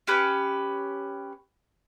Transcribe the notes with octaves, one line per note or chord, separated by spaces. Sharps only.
C#4 G4 B4